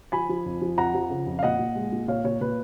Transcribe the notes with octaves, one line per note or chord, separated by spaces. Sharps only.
F3 G#5 B5
F3
F2
F3
F2 F#5 A#5
F3
C#3
F2
F5
A#2 D#5 F#5
A#2
G#3
A#2
A#2 C#5 F5
A#2 C#5
A#2 B4